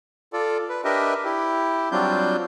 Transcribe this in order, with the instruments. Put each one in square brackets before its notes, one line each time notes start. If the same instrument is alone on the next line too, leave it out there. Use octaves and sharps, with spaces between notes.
[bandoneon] F4 A4 D5
B4
D4 G4 A#4 B4 D#5 E5
E4 G4
F#3 G3 C4 D4 F4 G6